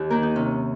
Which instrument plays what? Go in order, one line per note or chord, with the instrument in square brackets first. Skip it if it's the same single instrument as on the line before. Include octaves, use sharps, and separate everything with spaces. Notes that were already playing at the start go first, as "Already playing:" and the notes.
Already playing: [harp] D#2
D#3 A#3 A#4
D#4
C3 C#4